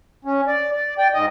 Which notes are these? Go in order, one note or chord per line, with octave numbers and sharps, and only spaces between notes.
C#4
D5
D5
D5 G5
G#2 D#5